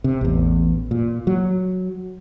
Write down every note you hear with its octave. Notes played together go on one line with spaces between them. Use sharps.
C3
A1 E2
A#2
F#3